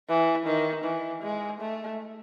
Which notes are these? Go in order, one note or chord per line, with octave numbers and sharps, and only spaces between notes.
E3
D#3
E3
G#3
A3